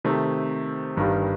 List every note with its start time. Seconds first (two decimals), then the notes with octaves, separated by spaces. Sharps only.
0.04 C3 D#3 A3 C4
0.97 G1 G2 D#3 G3